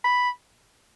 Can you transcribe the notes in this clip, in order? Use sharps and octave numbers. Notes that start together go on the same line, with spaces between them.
B5